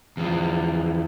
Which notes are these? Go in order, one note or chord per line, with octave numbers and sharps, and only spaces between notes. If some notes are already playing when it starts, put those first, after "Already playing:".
E2 F3